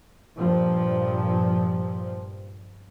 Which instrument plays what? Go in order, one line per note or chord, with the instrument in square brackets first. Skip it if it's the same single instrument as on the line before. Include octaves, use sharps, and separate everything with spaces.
[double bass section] G2 A#2 F3